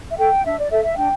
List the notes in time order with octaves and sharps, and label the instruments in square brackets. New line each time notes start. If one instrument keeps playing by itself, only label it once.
[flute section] E5
A4 G5
D4 E5
D5
A4 E5
E5
D4 G5